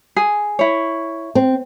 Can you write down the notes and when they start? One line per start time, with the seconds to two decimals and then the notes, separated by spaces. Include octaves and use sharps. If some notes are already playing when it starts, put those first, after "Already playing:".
0.16 G#4
0.59 E4 C#5
1.35 C4